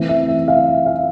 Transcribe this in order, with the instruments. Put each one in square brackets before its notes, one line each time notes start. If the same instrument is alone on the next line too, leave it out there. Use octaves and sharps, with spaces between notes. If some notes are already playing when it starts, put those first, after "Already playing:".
Already playing: [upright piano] E3 A3 C4
E5
E5
F5
F5